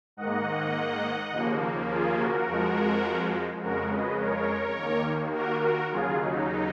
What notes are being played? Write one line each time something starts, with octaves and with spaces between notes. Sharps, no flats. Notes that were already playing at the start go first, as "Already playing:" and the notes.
G#2 D#3 A#3 D#5 F#5
D#2 C#3 F3 A#3
F4 G#4
F#4 A#4
F2 F3 G#3
F2 C#3 G#3 F#4 A#4
B4 D#5
A#4 C#5
D#2 D#3 A#3
F#4 A#4
F#4 A#4
D#2 C#3 F#3 F4 G#4
D#4